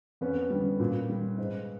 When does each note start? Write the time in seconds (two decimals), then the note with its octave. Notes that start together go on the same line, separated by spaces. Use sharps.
0.21 F2 B3 C#4
0.50 D3 G3
0.80 A#2
1.09 G3
1.38 G#2